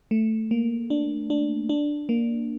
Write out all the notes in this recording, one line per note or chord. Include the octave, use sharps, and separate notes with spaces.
A3
A#3
D4
D4
D4
A#3